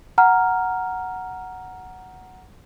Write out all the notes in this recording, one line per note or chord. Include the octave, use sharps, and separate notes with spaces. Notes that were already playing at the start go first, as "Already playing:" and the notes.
F#5 A#5 F6